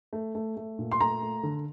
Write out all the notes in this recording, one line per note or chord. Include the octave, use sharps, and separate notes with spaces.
A3
A3
A3
A#2
C6
A3 A#5
A3
D3